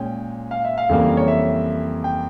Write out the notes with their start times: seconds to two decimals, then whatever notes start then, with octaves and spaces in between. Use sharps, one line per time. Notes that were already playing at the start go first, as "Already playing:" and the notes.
Already playing: A#2 G#3 C#4 G5
0.51 F5
0.65 E5
0.78 F5
0.89 F2 C#3 E3 G3 A#3
1.17 C#5
1.28 E5
2.04 G5